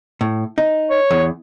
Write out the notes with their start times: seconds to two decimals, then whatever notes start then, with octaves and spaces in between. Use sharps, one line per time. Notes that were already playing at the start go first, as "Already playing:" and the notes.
0.21 A2
0.58 D#4
0.90 C#5
1.11 E2